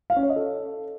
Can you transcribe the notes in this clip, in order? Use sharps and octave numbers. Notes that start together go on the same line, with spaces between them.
F5
C#4
C#5
D#5
A4